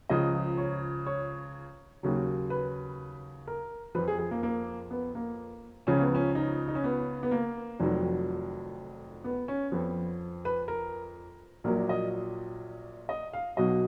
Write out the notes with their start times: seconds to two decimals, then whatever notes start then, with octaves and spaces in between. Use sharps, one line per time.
0.09 C#2 C#3 F3 D#5
0.58 C#5
1.06 C#5
2.03 D#2 C#3 F#3
2.50 B4
3.47 A#4
3.95 F2 F3 B4
4.08 G#4
4.19 G#4
4.31 A#3
4.43 A#3
4.91 B3
5.15 A#3
5.87 C#2 C#3 F3 C#4
6.01 B3
6.15 C#4
6.35 D#4
6.68 D#4
6.75 C#4
6.84 B3
7.23 B3
7.31 A#3
7.80 F1 F2 D#3 F#3
9.24 B3
9.48 C#4
9.72 F2 F3 B3
10.45 B4
10.68 A#4
11.64 A#1 A#2 F#3 A#4
11.89 D#5
13.09 D#5
13.33 F5
13.57 B1 B2 F#3 D#5